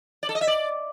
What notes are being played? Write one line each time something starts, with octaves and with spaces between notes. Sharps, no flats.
D5
A4
D#5
E5
D5